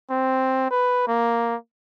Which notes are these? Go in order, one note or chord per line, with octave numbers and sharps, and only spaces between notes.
C4
B4
A#3